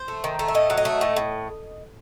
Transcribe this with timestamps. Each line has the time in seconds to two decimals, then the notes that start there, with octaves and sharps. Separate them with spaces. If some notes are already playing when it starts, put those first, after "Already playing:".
Already playing: C5
0.08 A3
0.24 D#3
0.39 A3
0.48 E5
0.55 A2 D#5
0.70 F#3
0.77 D#5
0.85 A3
1.01 A2
1.16 A2